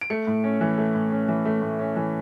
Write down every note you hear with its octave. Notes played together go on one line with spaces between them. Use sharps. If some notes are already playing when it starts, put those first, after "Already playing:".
D7
A3 C#7
A2
C#4
E3
A3
A2
C#4
E3
A3
A2
C#4
E3